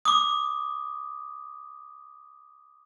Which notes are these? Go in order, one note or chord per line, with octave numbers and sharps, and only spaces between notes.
D6 D#6